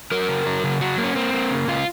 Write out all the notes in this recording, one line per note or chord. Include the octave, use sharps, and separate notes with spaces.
F#3 A#4
C#3
F#3
C#3
F#3 F#4
A#3
C#4
A#3 C4
A#3
C#3
C#3 F4